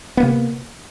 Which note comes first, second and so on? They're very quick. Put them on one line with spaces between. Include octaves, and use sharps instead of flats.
B3 A#3 C3